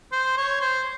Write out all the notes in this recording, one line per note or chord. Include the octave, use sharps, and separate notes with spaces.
C5
C#5
C5